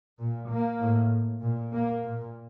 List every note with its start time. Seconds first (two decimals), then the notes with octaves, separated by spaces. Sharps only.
0.19 A#2
0.49 A#3
0.80 A2
1.42 A#2
1.73 A#3
2.04 A#2